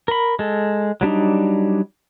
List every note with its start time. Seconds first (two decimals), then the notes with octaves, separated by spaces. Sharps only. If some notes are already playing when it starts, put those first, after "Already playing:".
0.08 A#4 B5
0.39 G#3 A4
1.01 F#3 G3 D4 D#4